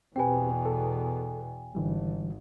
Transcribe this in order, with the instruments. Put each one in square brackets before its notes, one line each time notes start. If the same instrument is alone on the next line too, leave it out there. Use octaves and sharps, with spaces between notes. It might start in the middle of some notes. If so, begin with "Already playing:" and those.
[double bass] E2 B2 [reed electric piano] C4 G4 B4 [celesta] G5 G#5
[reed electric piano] A4
[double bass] G#1 [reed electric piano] D3 E3 G3